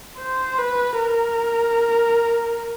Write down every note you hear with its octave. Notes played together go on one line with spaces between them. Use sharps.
C5
B4
A#4